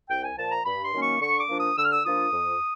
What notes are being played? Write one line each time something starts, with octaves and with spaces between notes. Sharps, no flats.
C2 G5
G#5
A#2 F3 A5
A#5
G2 B5
C6
D#3 F#3 A#3 C#4
C#6
D3 C#6
D6
F3 A#3 D4
D#6
D3 E6
F6
E6
F3 A#3 D4 F4 D#6
F2